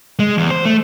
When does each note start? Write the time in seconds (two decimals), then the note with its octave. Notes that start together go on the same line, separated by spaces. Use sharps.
0.19 G#3
0.38 E2
0.50 C5
0.65 A3